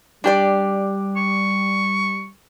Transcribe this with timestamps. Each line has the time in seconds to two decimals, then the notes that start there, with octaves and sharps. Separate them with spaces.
0.24 G3 D4 G4 D5
1.16 C#6